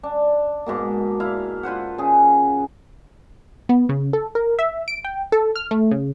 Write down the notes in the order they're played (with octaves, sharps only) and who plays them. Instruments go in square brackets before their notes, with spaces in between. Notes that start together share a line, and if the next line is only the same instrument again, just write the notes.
[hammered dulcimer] D4
G#2 B2 A#3
E4 F5
F4 B4 C5 F#5
C#3 G#4
[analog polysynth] B3
C#3
A4
A#4
E5
D7
G5
A4
F6
A3
C#3